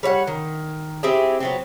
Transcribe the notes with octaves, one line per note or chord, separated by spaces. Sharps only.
G3 C#5 E5 F#5
D#3
C4 E4 G4 G#4
F#3 B3 C4